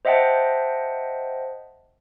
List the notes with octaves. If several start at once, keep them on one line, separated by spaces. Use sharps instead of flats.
C5 D#5 E5 F#5 G5 A5